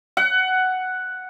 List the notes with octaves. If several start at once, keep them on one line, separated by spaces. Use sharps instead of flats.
F#5